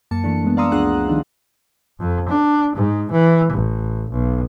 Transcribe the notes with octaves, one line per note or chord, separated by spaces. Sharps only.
F#2 A#3 A5 C#7
E3 A3 A#3 D4
G#3 A3 B3
D5 F5 A#5 C6 D#6 E6
C#2 F3 D4 G#4 F#5 F#6
D#3 F3 G3 D4 D#4
F2
D4
G#2
E3
A1
B1